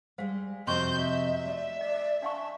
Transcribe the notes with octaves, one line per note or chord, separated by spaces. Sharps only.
G3 G#3 C5 F5
F2 C3 F#4 C5 D#5 C6 C#6 G6
E5
A3 D5
D5 D#5
D4 F5 A5 C#6